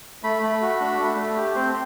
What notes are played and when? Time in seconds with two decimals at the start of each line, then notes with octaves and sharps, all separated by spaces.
0.23 A3 B5
0.43 A3
0.62 F#4
0.80 D4
0.99 A3
1.18 A3
1.37 G4
1.56 C4 C5